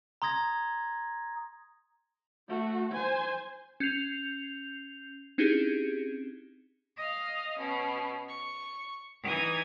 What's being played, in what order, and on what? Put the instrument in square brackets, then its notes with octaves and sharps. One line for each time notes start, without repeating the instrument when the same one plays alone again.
[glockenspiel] A#5 C6 D#6 G#6 A#6
[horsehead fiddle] A3 F#4
C5 G#5
[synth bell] C#4 G6 C7 F7
C4 C#4 D#4 E4 G4 G#4
[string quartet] D#5 F5
B2 C#4
C#6
E3 D#4 D#6 G#6